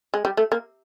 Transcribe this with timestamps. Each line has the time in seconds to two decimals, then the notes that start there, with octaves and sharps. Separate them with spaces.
0.14 G#3
0.25 G3
0.37 A3
0.52 A#3